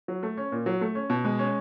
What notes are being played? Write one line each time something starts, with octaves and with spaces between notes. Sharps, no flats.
F#3
A3
C#4
A#2
F#3
A3
C#4
B2
G#3
C#4